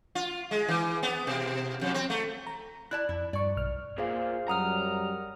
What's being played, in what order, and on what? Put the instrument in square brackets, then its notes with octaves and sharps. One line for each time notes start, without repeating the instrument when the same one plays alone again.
[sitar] F4
G#3
E3
B3
B2
F2
C4
A3
[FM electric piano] A#5
[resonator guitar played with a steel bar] E4 D5 A5 [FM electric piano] F#6
[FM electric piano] F2 [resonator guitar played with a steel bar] E4
[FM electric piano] G2 C#6 [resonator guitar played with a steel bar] D5
[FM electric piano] B1 F6
[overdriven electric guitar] A#2 [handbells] G#4 C5 F5
[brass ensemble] F#2 G3 [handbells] F#5 D#6 F6 [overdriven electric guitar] A#5